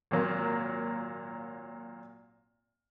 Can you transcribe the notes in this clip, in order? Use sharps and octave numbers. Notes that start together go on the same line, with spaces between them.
G#1 A#2 F#3 A#3